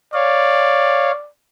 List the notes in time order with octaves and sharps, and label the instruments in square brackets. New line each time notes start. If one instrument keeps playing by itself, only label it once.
[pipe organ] C#5 F5 [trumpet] D5